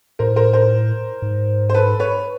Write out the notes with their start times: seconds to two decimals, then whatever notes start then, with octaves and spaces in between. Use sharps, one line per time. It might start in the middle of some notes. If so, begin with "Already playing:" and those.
0.19 A2 A#4 C5
0.36 A#4 C5
0.53 A#4 C5
1.22 G#2
1.69 C5
1.74 A4 B4
2.00 B4 C#5